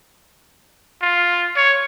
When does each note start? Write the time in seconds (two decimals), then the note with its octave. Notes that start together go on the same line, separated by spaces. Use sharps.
1.02 F4
1.56 C#5